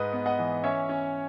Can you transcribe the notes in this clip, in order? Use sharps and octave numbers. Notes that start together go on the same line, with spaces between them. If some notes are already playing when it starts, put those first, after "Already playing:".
Already playing: G#2 B4 D#5
B3
D#5 F#5
E3
C#4 C#5 E5
C#4